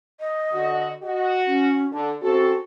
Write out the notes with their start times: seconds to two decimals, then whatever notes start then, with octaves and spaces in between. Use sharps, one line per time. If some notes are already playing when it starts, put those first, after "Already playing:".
0.20 D#5
0.53 D3 F#4
1.03 F#4 D#5
1.47 C#4
1.92 D3 D4
2.22 C#3 C4 F#4 A4